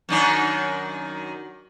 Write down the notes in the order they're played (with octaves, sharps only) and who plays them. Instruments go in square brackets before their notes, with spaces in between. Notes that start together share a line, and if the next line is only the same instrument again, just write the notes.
[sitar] F#2 D#3 D4